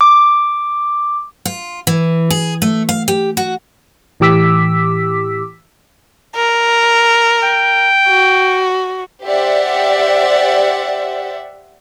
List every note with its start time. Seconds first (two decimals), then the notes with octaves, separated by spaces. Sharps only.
0.01 D6
1.46 F4
1.87 E3
2.30 G#4
2.62 A3
2.89 F5
3.08 G4
3.37 F#4
4.20 A2 E3 G4 D6 E6 B6
6.36 A#4
7.43 G5
8.08 F#4
9.23 G4 C5 D5 E5 F#5